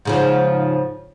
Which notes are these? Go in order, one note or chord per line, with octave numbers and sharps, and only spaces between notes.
G#2 C#3 F3